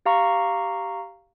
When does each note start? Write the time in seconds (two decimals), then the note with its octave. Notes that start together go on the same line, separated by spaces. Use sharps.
0.06 G4 F5 A#5 C#6